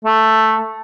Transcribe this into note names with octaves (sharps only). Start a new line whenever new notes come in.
A3